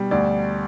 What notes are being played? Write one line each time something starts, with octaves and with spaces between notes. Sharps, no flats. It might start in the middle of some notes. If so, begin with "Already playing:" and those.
Already playing: B2 G3
D2 D5